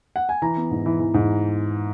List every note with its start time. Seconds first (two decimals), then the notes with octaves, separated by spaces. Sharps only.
0.16 F#5
0.29 G#5
0.42 E3 A#5
0.57 B3
0.71 G#2
0.86 E3
1.00 E3
1.14 G#2